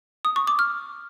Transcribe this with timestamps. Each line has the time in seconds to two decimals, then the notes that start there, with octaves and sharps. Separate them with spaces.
0.25 D#6
0.36 C#6
0.47 D6
0.59 F6